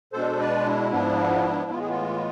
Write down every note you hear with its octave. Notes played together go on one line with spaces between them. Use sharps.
B2 G#3 D4 A4 C5
B4 D5
E4
G#2 F3 B3 D4
A2 E3 G#3 B3 F4
G#4
F4